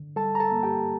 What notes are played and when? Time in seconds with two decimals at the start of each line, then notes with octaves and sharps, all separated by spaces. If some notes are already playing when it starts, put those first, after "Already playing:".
Already playing: D3
0.16 G3 A4 A5
0.35 A#5
0.40 A4 A5
0.52 A#3
0.63 G4 G5